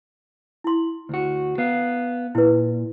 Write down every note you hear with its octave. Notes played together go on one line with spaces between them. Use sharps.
E4 C6
D2 F#4
B3 F5
A#2 E4 B4